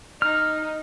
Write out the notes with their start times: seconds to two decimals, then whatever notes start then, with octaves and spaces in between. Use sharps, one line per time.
0.22 D#4 F6